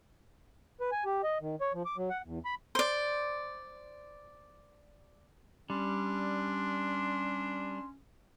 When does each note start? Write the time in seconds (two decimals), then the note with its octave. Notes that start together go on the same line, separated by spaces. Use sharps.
0.81 B4
0.92 G#5
1.05 G4
1.23 D#5
1.41 D#3
1.61 C#5
1.74 F3
1.85 D6
1.97 F#3
2.10 F#5
2.25 E2
2.45 B5
2.75 C5 D5
5.70 G3 C#4 D4 C6